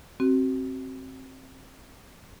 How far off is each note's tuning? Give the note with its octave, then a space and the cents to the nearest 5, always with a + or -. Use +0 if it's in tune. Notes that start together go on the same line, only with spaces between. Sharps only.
C4 +15 F#4 +30